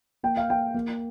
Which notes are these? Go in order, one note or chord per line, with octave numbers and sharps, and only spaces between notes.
A#3 G5
F5
A#3 G5
A#3